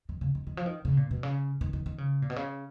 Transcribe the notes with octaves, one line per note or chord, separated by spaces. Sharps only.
D#3
C#3
D#3
D#3
F3
D#3
C#3
A#2
B2
C#3
D#3
D#3
D#3
C#3
A#2
B2
C#3